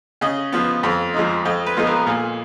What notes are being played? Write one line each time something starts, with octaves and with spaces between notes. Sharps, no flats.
C#3 D#5
F3 B3
F2
F3 G#3 D#4
F2 D#5
B4
F3 G#3 B3 D#4
A#4
A#2 G#4